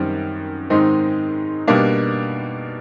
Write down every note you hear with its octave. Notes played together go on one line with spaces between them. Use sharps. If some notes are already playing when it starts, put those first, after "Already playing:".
Already playing: F#2 D#3 G3 C4
G#2 D#3 G#3 C4 D#4
B2 G3 A#3 D4